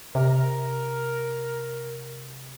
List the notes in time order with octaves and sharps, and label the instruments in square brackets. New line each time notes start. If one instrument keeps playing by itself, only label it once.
[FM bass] C3 [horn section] A#4